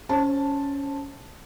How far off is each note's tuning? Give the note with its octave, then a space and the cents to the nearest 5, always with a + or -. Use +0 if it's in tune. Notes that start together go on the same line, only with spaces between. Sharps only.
C#4 +10 C5 +30 A5 +0